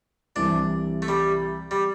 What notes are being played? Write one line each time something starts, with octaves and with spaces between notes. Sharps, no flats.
C2 C3 E3 D4
A3
G3
G3